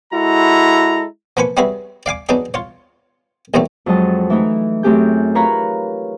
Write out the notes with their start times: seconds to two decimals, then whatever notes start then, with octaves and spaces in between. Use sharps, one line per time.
0.12 G#3 E4 F#4 A4 A#5
1.37 F3 A#3 B4 G#5 C#6
1.57 G3 C#4 E4 F#4 G#4 B4
2.06 D5 F5 G#5 D6
2.29 F#3 B3 D4 D#4 G#4
2.54 F4 C#5
3.54 A1 D#2 B2 F#3 G3 A3
3.86 F2 F#3 G#3 D#5 A5
4.30 E3 A3 D#4 E4
4.83 F#2 A3 C4 G4 G#4 G6
5.35 F4 A#4 B4 C#5 A#5 B5